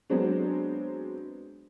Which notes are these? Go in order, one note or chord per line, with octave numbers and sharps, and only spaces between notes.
F#3 G#3 B3 C4 D4